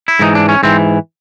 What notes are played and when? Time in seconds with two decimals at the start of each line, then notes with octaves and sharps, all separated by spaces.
0.08 E4
0.19 G#2 E3 D#4
0.35 D4
0.49 C#4
0.63 G#2 E3 C4